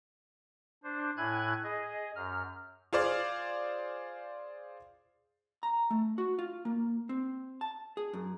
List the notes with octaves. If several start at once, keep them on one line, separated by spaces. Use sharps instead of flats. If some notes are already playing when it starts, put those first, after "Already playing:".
D4 C5
A2 E4 G#5 F#6 G#6
G#4 D#5
F#2 F6
F4 G#4 C5 D5 F5
A#5
A3
F#4
F4
A#3
C4
A5
G#4
F#2